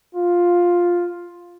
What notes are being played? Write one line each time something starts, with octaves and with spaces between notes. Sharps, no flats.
F4